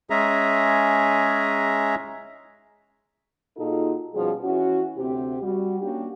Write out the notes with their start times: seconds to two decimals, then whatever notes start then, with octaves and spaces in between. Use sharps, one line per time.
0.10 G#3 C#4 G#4 E5 A#5
3.57 A#2 D#4 F4 F#4 G#4 A4
4.15 B2 F3 G3 C#4 G#4
4.44 E3 C#4 E4 F#4
4.98 D2 C3 C4 G4
5.43 G3 F#4
5.81 A#3 C#4 D4 F#4 G4